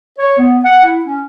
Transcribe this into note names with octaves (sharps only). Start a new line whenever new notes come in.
C#5
B3
F#5
E4
C#4